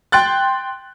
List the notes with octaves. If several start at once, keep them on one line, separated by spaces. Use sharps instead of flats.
G5 C6 F#6 A6